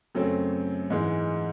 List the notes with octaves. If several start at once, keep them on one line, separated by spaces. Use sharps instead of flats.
F#2 C#3 F#3 A3 C4
G#2 E3 G#3